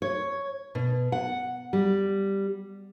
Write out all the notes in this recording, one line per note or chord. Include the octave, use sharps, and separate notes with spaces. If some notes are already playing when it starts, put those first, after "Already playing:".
C#5
B2
F#5
G3